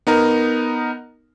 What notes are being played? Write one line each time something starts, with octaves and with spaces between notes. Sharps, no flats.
B3 D#4 A#4